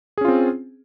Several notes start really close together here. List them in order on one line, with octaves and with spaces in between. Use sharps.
G#4 C#4 F4 C4